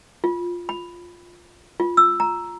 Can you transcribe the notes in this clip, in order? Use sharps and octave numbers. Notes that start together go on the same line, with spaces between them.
F4
B5
F4
E6
A#5